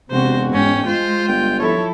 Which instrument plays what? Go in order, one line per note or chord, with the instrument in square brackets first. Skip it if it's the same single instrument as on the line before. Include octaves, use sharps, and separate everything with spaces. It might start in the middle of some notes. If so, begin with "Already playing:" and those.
[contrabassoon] E1 [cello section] C3 F#4 [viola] C5
[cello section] G#2 [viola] C#4 G5
[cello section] G#3 [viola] F4 [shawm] C5
[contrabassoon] G1 [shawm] G5
[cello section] F3 E4 A4 [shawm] C#5